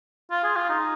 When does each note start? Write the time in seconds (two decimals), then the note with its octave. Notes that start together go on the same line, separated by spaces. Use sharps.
0.31 F4
0.44 G#4
0.56 F4
0.70 D#4